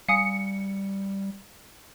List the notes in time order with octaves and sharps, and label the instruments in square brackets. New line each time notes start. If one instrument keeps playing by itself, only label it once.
[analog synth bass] G3 [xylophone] F5 G#5 D#6 [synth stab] C#7